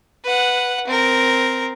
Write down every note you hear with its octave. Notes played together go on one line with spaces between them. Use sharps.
B4 F#5
C4 A#4